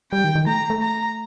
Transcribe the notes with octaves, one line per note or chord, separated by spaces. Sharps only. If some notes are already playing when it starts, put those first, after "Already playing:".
G3 G5
D#3
D#3
A3 A#5
A3
A#5